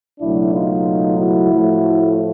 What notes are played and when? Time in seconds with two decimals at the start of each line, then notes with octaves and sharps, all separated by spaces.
0.20 C#2 B2 F#3 A3 D4 E4
0.54 D#4 F4
1.19 E4 F#4
1.52 A2 F3 A3